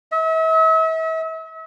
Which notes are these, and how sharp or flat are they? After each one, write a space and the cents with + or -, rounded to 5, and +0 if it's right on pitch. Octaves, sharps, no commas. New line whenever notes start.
E5 -40